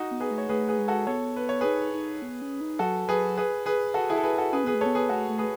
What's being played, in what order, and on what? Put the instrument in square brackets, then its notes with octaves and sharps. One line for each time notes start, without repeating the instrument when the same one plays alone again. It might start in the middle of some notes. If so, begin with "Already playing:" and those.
Already playing: [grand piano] D#4 F#4
[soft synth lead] B3
[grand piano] G#4 B4
[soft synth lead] A3
[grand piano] C#5
[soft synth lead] A3 [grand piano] G#4 B4
[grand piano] G#4 B4
[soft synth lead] G#3
[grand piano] F#4 A4
[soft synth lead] B3 [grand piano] A4 C#5
[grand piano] B4
C#5
[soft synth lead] D#4 [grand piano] G#4 B4
[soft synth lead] D#4
B3
C#4
D#4
[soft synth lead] F#3 [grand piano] F#4 A4
[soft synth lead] F#3 [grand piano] G#4 B4
[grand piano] G#4 B4
G#4 B4
F#4 A4
E4 G#4
A4
G#4 B4
F#4 A4
[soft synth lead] C#4 [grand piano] G#4 B4
[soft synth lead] B3 [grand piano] G#4 B4
[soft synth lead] A3
[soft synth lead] B3 [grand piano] A4 C#5
[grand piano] G#4 B4
[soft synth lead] A3 [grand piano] F#4 A4
[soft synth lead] A3
[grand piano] G#4 B4